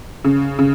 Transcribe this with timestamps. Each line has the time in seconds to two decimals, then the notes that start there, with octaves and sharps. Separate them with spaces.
0.25 C#3
0.59 C#3